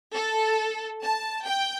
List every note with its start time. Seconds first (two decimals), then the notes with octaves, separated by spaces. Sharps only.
0.14 A4
1.02 A5
1.46 G5